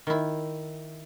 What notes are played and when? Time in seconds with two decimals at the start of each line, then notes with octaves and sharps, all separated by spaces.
0.07 D#3 E4